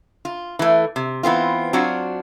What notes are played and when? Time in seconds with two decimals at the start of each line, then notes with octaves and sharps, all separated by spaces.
0.25 F4
0.59 E3 A3
0.96 C3
1.23 E3 B3 C4 F4
1.73 F#3 C4 D4 F4 F#4